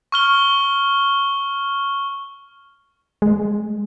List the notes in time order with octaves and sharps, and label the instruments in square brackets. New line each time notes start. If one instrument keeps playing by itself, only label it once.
[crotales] C#6 F6 G7
[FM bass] G#3